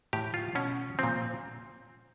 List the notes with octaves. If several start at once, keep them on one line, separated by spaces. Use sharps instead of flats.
A2 E3 G4
F4
B2 C#4
A#2 F3 C4